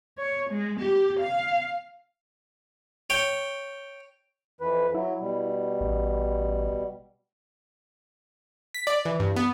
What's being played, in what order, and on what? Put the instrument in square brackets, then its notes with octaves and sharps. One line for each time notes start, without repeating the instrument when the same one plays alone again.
[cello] C#5
G#3
G4
F5
[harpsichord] C#5 G5
[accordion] F2 E3 B4
[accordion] F#3 [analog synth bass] E4
[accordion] B2 G3
[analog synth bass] A1
[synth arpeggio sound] B6
D5
E3
G2
B3